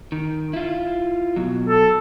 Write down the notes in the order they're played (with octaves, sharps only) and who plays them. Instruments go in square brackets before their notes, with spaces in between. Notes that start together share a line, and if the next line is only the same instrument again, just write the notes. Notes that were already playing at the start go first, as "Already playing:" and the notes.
[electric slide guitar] D#3
E4 F4
B2 F#3
[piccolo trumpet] A4